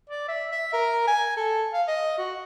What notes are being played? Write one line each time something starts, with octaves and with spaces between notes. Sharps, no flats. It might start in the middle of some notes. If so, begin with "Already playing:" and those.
D5
E5
E5
A#4
G#5
A4
F5
D#5
F#4